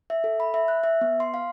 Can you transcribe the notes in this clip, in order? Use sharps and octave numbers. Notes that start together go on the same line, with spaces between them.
E5
A4
B5
E5
F#6
E5
B3
C6
F5